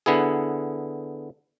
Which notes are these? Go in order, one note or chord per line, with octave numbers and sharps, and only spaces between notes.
D3 B3 E4 G#4